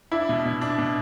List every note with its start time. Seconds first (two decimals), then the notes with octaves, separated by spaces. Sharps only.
0.12 D4 E4
0.29 B2
0.45 B2
0.61 D4
0.78 B2